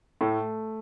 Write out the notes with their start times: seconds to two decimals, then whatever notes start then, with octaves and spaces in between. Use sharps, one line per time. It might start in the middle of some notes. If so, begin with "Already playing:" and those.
0.21 A2 A3